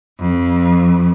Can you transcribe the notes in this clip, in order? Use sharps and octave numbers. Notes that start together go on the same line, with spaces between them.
F2